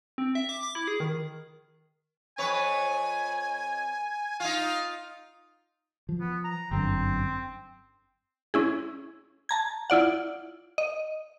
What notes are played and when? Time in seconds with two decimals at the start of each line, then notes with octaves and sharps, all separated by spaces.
0.18 C4
0.35 E5
0.49 D6
0.63 D6
0.75 E4
0.88 G#4
1.00 D#3
2.38 F2 B4 C#5 G#5
4.40 D#4 F4 F5
6.09 F3
6.20 B3
6.44 A#5
6.71 G1 F#2 D3 C4
8.54 C#4 E4 G#4
9.49 A5 A#5 G#6
9.90 E4 F4 D5 F#5
10.78 D#5